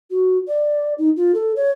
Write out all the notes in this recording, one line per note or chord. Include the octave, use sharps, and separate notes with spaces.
F#4
D5
D#4
F4
A4
C#5